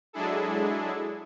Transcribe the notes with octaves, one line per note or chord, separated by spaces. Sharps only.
F#3 G#3 D4 E4 G#4 A4